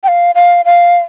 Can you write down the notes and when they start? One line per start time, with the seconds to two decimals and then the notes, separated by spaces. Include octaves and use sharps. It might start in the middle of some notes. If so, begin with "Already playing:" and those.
0.03 G5
0.08 F5
0.35 F5
0.65 F5